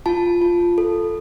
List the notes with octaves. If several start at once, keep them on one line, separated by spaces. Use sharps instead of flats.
F4 A5
F4
A4